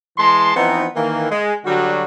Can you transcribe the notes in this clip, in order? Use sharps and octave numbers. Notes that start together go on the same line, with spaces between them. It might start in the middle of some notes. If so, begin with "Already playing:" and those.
E3 G#3 A5 C6
E3 F3 B3 C4 D#4
D#3 E3 A#3
G#3
D3 F#3 G3 F#4